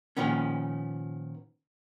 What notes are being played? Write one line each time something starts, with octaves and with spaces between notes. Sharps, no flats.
A#2 D#3 F3 B3 C#4